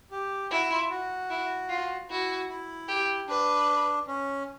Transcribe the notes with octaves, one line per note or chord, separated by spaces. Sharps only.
G4
E4 F#4
F4
F#4
E4
F4
E4 F#4
E4
G4
D4 B4
C#4